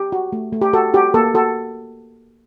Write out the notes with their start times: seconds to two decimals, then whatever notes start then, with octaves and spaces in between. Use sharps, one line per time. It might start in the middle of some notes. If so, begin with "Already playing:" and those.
Already playing: G4
0.12 F#4
0.33 A3
0.53 A3
0.61 G4
0.73 F#4 A4
0.94 F#4 G4
1.14 A#3 A4
1.34 F#4 A4